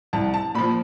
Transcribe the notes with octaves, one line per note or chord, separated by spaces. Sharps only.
C2 A5
A5
A#2 F3 B5